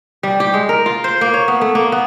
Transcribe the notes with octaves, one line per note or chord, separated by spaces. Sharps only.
G3
G4
G#3
A#4
F4
C5
A#3
C#5
B3
A3
A#3
B3